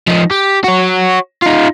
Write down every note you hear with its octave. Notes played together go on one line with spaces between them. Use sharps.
F3 D#4
G4
F#4 C#5
D#4 F4